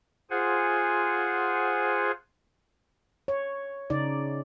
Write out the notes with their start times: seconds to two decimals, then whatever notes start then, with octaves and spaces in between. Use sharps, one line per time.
0.30 F4 G#4 C5 F#5 G#5
3.28 C#5
3.90 C#3 D#4 D5